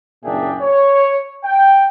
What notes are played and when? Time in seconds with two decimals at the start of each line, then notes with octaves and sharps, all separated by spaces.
0.23 F#1 A#2 D4 G#4 E5 G5
0.61 C#5
1.44 G5